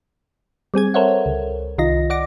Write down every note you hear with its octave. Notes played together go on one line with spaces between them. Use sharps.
G3 C4 G#4 G#6
A4 A#4 C5 C#5 E5 F#5
C#2
C2 D#3 F4 D#5 A#6
D5 F#5 D6 A#6